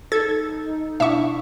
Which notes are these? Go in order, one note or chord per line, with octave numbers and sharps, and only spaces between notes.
D#4 A4 G#6
B2 D4 E4 E5 C#6